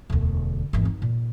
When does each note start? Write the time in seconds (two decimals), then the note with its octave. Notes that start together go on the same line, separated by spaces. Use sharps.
0.10 E1 D2
0.73 G#1 E2
0.85 D#4
1.02 A#2